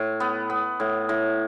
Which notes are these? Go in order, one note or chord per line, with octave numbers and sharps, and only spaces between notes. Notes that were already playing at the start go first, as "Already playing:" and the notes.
Already playing: A2
B3
B3
A2
A2